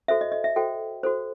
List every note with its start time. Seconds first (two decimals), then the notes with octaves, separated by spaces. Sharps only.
0.08 F#4 A4 C5 E5
0.21 D#5
0.32 D#5
0.44 E5
0.56 F#4 A4 C5 G5
1.03 F#4 A4 C5